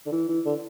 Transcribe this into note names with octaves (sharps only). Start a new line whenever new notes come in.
D3
E3
E3
D3